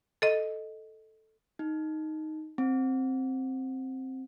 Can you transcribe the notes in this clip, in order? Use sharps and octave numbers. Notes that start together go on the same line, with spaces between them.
A4 D#5
D#4
C4